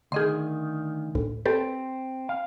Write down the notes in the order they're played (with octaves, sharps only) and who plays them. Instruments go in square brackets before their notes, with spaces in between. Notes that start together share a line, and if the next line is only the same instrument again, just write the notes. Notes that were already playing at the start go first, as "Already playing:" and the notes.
[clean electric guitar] D2 D#3 [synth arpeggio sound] G#4 D#5 C6
[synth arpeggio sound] D2 A2
[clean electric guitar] C4 [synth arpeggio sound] G4 A4 B4
[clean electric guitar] F5